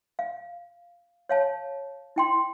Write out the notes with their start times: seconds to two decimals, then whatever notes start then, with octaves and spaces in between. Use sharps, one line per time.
0.19 F5
1.29 C#5 F5 A5
2.16 E4 G5 C6